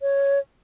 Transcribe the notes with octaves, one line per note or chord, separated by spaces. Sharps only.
C#5